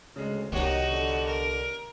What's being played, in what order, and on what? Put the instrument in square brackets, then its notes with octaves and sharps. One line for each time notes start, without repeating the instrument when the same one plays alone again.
[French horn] D2 [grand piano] C#3 G#3
[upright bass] C2 B3 [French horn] D#3 [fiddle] D#4 F#4 [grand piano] G4 C#5
[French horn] D3
[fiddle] A#4